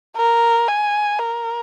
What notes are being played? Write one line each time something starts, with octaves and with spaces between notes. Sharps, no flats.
A#4
G#5
A#4